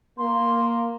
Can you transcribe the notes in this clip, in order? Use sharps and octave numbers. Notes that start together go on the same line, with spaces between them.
A#3 C6